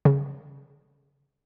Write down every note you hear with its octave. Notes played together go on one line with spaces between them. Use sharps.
C#3